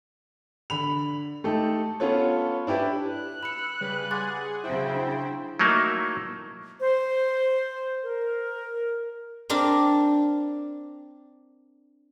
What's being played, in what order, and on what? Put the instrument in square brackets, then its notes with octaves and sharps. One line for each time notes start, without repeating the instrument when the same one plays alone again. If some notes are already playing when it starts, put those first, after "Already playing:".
[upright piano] D3 B5 F7
A3 D#4 G4 A4
B3 C#4 F4 A4 B4 C#5
D4 E4 G4 B4
[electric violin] F#6
[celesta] B5 C#7 [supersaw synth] E6
[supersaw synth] C#3 G3 B4
[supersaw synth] G#4 F#5 G#5 [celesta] C6 D6 A6
[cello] C#3 F#3 [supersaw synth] E4 C5 G5
[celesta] D4
[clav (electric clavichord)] F#3 A3 A#3 D#4 E4
[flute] C5
A#4
[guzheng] C4 D4 A#4